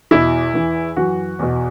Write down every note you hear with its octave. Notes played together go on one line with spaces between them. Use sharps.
E2 B2 E4
E2 E3
F#2 E3 F#4
E2 B2